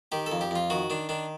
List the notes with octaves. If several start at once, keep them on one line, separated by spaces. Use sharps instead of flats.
D#3 G4
A4
F2
G4
F2 F4
D#3 F#4
D#3 D4
D#3 D4